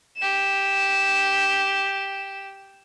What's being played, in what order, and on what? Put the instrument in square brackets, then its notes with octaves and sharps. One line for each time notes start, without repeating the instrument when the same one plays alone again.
[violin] G4 E7